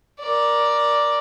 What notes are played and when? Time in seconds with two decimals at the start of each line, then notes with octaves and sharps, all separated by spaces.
0.21 A#4 D5